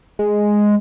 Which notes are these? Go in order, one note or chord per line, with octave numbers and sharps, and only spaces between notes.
G#3